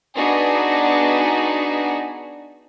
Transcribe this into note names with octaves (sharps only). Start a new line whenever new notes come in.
B3 D4 D#4 F#4 G#4